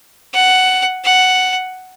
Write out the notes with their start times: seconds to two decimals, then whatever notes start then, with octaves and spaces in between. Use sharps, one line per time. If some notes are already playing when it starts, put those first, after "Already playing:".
0.34 F#5
1.04 F#5